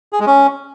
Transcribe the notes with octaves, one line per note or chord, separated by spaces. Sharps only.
G#4
G#3
C#4